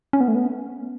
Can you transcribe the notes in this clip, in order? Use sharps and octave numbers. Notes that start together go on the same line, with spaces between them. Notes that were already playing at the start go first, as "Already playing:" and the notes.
C#4
B3
A3
B3